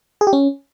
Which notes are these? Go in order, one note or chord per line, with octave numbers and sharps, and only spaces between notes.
G#4
G4
C#4